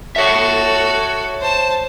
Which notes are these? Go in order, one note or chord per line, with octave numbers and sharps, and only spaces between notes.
F#4 A4 C#5 E5
C5 A5